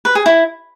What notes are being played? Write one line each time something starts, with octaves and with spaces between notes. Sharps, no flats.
B4
G#4
E4